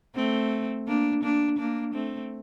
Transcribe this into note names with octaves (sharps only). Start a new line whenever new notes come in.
A3 C4
A#3 D4
A#3 D4
A#3 D4
A3 C4